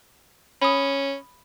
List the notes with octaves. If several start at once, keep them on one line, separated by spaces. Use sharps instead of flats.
C#4 B5 D#6